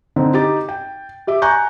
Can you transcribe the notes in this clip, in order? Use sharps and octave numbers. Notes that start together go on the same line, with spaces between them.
D3 C4 D#4
D#4 G4 D6 A6
G5
G4 E5 D6
G#5 A#5 C#6 F#6 G6